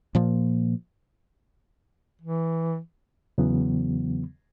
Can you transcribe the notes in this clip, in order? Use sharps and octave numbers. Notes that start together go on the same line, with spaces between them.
A#2 F3 A#3
E3
E2 C#3 E3 F#3 B3